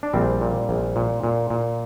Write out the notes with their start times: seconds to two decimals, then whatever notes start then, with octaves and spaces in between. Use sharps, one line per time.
0.03 D4
0.13 A#1 G3 C4
0.41 A#2
0.69 A#1
0.96 A#2
1.24 A#2
1.50 A#2